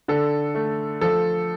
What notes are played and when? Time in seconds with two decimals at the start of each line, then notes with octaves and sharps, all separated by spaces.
0.08 D3 A4
0.55 A3
1.01 F3 A4